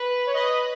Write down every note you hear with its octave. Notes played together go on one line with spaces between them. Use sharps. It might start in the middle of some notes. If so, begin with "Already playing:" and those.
Already playing: B4
C#5
B4 D#5